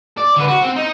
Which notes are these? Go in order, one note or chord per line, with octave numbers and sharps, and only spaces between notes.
D5
D3 B4
F#4
C4
D#4